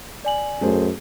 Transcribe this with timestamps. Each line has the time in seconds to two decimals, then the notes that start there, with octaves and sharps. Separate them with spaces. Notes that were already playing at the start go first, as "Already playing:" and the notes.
0.25 D5 G#5 F#7
0.61 F#2 A3 G#4 C5